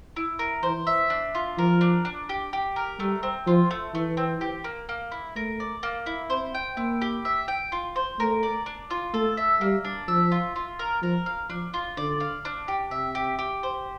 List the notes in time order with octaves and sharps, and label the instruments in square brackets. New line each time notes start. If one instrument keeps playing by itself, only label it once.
[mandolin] E4
A#4
[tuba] E3 [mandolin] C5
[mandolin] E5
D4
F4
[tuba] F3 [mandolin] A#4
[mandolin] D4
D4
G4
G4
A#4
[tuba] G3 [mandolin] A3
[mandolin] C4
[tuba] F3 [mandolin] F4
[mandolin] A3
[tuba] E3 [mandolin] A3
[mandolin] C4
G4
A#3
A#3
E4
[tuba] A3 [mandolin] A#4
[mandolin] D5
A#3
E4
[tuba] C4 [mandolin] C5
[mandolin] G5
[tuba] A#3 [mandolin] E4
[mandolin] G4
E5
G5
F4
C5
[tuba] A3 [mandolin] A#4
[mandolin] D5
D4
F4
[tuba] A3 [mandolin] A4
[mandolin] E5
[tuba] G3 [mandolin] A#3
[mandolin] D4
[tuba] F3 [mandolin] E5
[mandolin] F4
F4
A#4
[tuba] F3 [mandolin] A#4
[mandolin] F5
[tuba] F3 [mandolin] D4
[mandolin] F4
[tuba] D3 [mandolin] D5
[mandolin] F5
D4
G4
[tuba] C3 [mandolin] E5
[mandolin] G4
G4
C5